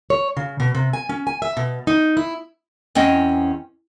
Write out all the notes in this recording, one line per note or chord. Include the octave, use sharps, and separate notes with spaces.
C#5
C#3
B2
C3
G#5
C#4
G#5
E5
B2
D#4
E4
E2 C4 C#4 D#5